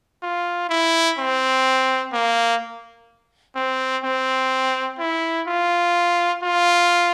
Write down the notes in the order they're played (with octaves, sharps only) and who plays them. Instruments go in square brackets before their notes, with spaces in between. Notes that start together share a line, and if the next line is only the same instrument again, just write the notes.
[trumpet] F4
E4
C4
A#3
C4
C4
E4
F4
F4